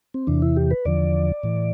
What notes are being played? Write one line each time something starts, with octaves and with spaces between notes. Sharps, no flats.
C4
E2 C3 E3 D4
E4
G4
B4
E2 D3 F3 D5
A2 E3